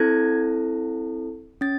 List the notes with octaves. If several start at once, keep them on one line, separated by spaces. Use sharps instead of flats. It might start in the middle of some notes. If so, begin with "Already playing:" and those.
Already playing: C4 E4 A4 G#6
C#4 A6